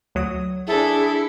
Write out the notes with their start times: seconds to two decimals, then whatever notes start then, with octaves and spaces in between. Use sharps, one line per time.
0.15 D2 F#3 D#6
0.67 D4 E4 G#4 A4